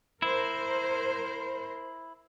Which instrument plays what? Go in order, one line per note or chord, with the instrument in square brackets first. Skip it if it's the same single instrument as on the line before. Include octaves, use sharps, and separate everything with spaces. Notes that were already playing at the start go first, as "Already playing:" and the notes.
[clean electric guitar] E4 [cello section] A#4 C5